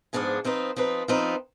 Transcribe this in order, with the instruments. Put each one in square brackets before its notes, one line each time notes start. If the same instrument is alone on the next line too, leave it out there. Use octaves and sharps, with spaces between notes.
[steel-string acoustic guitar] G#2 F3 B3 D4 G#4
F3 C4 D#4 B4
F3 C4 D#4 B4
F3 C4 D#4 B4